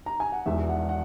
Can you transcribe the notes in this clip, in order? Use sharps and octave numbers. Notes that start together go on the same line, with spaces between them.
A#5
G#5
F#5
E1 E2 D#3 E5
F#5
F#5